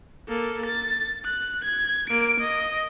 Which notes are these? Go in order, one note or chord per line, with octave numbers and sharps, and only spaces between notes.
A#3 A4
A6
F#6
G#6
A#3 D7
D#5